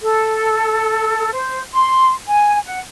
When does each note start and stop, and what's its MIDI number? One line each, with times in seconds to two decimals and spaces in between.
0.01 1.30 69
1.33 1.60 72
1.73 2.13 84
2.28 2.59 80
2.65 2.81 78